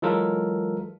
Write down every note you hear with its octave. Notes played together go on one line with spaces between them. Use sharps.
E3 F#3 G#3 F4 A4 A#4